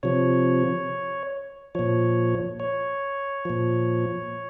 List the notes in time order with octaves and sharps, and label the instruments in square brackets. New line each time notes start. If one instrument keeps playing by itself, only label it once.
[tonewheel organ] C3 F3 C#5
A#2 F3 C#5
C#5
A#2 F3